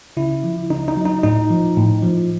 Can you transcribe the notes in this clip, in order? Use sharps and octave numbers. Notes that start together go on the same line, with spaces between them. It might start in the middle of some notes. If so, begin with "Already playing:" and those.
C#3 E4
F3
C#3 D#4
D#4
F#3
D#4
A2 D#4
F3
A2
F3